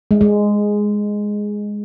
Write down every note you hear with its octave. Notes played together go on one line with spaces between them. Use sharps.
G#3
G#3